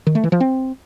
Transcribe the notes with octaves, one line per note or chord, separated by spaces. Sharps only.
D#3
A3
E3
F3
C4